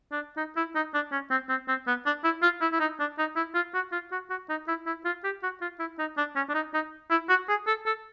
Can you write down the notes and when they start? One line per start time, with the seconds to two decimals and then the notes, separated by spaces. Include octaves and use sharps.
0.12 D4
0.37 D#4
0.57 E4
0.75 D#4
0.94 D4
1.12 C#4
1.31 C4
1.49 C4
1.68 C4
1.87 B3
2.06 D4
2.24 E4
2.43 F4
2.61 E4
2.72 E4
2.80 D#4
3.00 D4
3.19 D#4
3.36 E4
3.55 F4
3.74 F#4
3.92 F4
4.12 F#4
4.30 F#4
4.49 D#4
4.68 E4
4.87 E4
5.05 F4
5.24 G4
5.43 F#4
5.61 F4
5.80 E4
5.99 D#4
6.17 D4
6.36 C#4
6.49 D4
6.54 D#4
6.74 D#4
7.10 E4
7.29 F#4
7.49 G#4
7.67 A4
7.86 A4